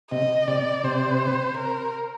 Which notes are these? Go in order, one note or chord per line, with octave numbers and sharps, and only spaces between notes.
C3 D#5
C3 D5
C3 C5
A#4